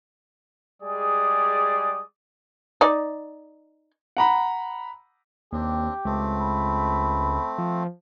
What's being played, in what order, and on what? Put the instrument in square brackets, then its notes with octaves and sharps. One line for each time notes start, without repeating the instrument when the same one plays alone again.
[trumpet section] G3 G#3 G#4 D5 D#6
[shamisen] D#4 D5
[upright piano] F#5 A#5 B5
[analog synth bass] D#2 [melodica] C4 D4 [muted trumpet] G4
[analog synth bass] C#2 [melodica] A3 C4
[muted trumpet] B5
[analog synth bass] F3